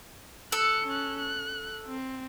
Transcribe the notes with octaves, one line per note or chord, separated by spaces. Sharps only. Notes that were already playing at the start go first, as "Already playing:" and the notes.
A4 E6 F#6 C#7
C#4 F#6
F#6
C4